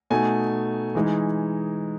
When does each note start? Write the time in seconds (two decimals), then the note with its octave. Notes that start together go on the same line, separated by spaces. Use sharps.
0.10 B2 A3 D#4 G#5
0.95 E3 G#3 D#4